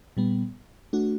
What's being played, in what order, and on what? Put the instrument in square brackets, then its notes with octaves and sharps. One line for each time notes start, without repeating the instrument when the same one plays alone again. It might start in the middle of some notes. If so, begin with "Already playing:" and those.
[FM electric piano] A#2 G3 B3
A3 D4 F#4